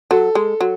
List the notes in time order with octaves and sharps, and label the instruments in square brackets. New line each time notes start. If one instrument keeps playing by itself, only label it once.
[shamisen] F#3 [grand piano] A4
[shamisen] G#3
F#3